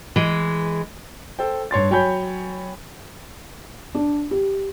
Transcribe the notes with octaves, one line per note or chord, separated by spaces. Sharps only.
E3 G#3
A4 C5 G5
G2 C#5 C6 A6
F#3 C#5 G5 G#5 B5 G6
D4
G4